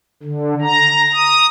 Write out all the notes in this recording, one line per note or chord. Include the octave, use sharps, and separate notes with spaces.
D3
A#5
D#6